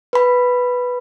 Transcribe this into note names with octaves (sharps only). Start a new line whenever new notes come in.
B4 B5